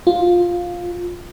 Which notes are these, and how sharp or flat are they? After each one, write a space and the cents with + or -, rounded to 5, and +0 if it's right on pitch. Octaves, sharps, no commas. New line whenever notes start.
F4 +10